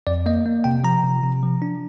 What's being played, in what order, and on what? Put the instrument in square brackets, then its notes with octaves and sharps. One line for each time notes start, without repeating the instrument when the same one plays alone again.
[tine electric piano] F2 D5
A#3 D#5
A#3
C3 G5
F3 A#5
C3
C3
F3
D4